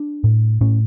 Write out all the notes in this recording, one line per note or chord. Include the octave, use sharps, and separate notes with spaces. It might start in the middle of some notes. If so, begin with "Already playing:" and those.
Already playing: D4
A2
A2 C#4